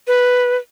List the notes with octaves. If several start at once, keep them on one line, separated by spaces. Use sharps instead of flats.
B4